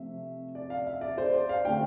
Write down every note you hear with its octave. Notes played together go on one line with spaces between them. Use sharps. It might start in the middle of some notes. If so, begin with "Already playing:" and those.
Already playing: C3 F3 A3 C4 E5
D5
F5
E5
D5
C5
D5
F5
D3 A3 C4 G5